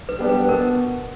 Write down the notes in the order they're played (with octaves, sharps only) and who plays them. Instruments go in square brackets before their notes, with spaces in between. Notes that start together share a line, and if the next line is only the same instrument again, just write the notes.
[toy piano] B4
[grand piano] G3 B3 D4 G4
[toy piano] B4
[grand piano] B2 [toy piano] A#4